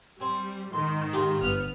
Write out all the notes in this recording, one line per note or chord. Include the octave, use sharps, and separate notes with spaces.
G3 C4 G#5
G#2 D#3 C6
F4 G4 G#4
G1 B3 F6